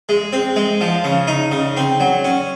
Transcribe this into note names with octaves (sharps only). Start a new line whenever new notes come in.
G#3
C4
G#3
F3
C#3
D#4
C#3
C4
F#3
C#4